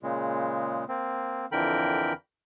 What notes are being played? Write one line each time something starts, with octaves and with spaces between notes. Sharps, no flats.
A#2 C#3 G#3
A#3 C4
F2 D3 E3 A#4 G5 B5